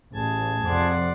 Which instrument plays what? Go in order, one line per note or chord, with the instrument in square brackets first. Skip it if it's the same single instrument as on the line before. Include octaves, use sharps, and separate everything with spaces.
[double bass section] A1 [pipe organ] G#4 A5 G#6
[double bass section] F2 C3 [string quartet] D5 F#5 C6